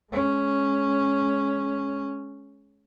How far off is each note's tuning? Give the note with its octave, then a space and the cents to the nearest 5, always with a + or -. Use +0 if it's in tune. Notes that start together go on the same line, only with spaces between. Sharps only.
G#3 +20 C#4 +0